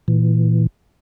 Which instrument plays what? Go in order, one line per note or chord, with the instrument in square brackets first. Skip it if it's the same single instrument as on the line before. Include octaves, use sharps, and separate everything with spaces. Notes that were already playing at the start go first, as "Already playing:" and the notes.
[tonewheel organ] A#2 E3